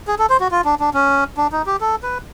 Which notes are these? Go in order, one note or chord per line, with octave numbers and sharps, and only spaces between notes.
G#4
A4
C5
F#4
F4
D4
D4
C#4
D4
D#4
G4
A4
B4